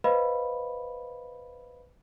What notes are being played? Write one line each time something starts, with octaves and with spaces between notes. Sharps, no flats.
B4 C5 D#5 F5 B5